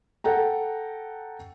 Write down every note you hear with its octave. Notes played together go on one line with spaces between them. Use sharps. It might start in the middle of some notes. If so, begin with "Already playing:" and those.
A4 F#5 G5 A#5